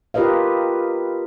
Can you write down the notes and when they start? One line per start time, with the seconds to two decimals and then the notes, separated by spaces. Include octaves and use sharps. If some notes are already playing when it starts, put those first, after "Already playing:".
0.14 F4 G4 A#4 B4 D#5 F5